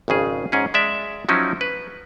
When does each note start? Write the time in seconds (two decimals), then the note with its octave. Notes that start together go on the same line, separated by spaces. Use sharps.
0.08 G#1 F2 C#3 G#4
0.52 G#2 C#4 G#4
0.74 G#3 D5 E5
1.29 F3 F#3 C#4 D#4 E4
1.61 B4